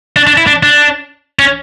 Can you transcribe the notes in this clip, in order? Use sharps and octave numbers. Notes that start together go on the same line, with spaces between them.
D4
D4
E4
D4
D4
C#4